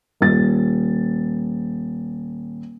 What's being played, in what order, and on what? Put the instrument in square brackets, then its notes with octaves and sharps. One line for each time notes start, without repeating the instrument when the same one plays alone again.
[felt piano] D#1 A6